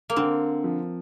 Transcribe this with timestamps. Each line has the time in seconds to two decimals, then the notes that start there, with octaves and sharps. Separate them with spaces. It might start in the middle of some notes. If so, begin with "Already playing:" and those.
0.10 A#3
0.16 D3 C4
0.64 F3